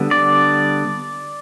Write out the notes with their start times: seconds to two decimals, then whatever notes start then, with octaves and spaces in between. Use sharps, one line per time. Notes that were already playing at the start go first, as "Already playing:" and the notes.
Already playing: D3 G3 B3
0.11 D5